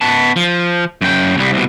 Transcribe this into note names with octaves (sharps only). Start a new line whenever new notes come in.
B3 A5
F3
F#2 G5
C2 G3
C2 B2